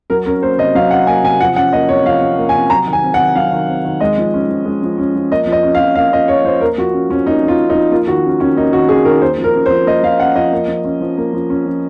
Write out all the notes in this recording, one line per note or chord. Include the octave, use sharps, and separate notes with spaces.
F#3 A#4
C#4 A#4
A#3 C5
C3 D#5
F#3 F5
C#4 F#5
A#3 G#5
C3 G#5
F3 F#5
C#4 F#5
A#3 D#5
C3 C#5
F3 F5
C#4
A#3
G#5
C3
F#3 A#5
D#3
G#5
C4
F#5
D#3
F#3 F5
D#3
C4
D#3
G#3 D#5
F3
C#4
F3
G#3
F3
C#4
F3
A#3 D#5
F3
D#5
C#4
F5
F3
A#3 F5
F3 D#5
C#4 C#5
F3 C5
A#3 A#4
F3 F#4
C#4
F3 C#4
A#3 D#4
F3
F4
C#4
D#4
F3
A#3 F4
D#3 F#4
C#4
D#3 C#4
A#3 D#4
D#3 F#4
C#4 G#4
D#3 A#4
A#3 C5
F3
A#4
C#4
C5
F3
A#3 D#5
F3 F5
C#4 F#5
F3 D#5
A#3
F3
C#4
F3
A#3
F3
C#4
F3